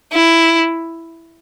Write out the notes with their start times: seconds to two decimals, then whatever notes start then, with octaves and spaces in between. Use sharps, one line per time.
0.13 E4